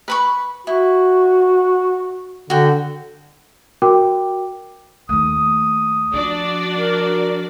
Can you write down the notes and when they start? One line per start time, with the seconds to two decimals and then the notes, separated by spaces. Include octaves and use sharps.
0.08 B4 B5 C#6
0.67 E4 F#4
2.50 D3 F#4 G5
3.82 F#4 A#4 G5 D6
5.09 D#2 A3 D#6
6.13 F3 D4 F#4 D5
6.77 A#4